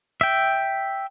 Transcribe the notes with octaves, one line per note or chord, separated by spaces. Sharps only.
E5 G5